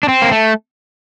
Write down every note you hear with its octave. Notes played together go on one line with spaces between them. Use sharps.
D4
C4
A#3
A3